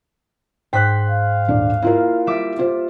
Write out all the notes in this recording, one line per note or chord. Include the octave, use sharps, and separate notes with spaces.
G#2 C5 G5 F#6 B6
F5
D#1 D4 D5
A#3 E4 F4 A#4
G3 E5 D6
F4 C5